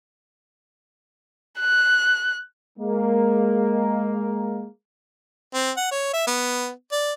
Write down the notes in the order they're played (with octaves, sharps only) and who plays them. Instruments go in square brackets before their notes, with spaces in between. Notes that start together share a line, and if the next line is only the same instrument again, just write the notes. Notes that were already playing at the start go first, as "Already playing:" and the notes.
[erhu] F#6
[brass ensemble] G#3 A#3
[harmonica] C4
F#5
C#5
E5
B3
D5